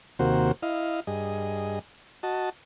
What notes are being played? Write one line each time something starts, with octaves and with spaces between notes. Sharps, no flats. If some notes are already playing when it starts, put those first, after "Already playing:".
D#2 C3 A#3 F#4 C5
E4 D#5 F5
G2 G#4 D#5
F#4 D#5 A5